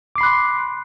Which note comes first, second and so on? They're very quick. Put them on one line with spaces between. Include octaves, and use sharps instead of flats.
D6 C7 B5 F#6 C6